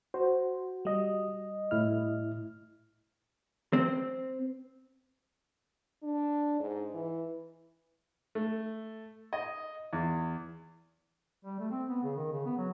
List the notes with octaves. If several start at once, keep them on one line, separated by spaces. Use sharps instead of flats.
F#4 C5
G3 D#5
A2 E4 F6
C4
D4
G#2
E3
A3
D#5
E2
G3
A3
C4
B3
C#3
D#3
C#3
B3
F#3